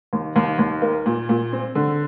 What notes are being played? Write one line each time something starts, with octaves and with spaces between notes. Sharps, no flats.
D#2
D#2
D#2
A#3
A#2
A#2
C4
D3